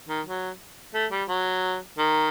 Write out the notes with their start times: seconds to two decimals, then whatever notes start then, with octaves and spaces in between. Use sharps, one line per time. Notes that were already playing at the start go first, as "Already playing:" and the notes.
0.09 D#3
0.26 F#3
0.94 A3
1.11 G3
1.29 F#3
1.98 D#3